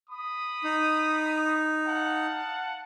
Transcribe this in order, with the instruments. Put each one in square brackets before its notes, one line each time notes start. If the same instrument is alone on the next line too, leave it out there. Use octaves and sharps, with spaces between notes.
[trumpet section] B5 D#6
[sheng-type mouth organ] D#4
[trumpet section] F5 F#5 A5